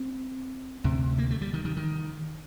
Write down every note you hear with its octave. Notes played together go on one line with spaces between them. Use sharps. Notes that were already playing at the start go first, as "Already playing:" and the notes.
Already playing: C4
D2 C3
A#3
A3
G3
D#3
D#3
D#3